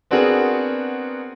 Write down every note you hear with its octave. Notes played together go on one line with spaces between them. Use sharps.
B3 C4 D4 F#4 G#4 A#4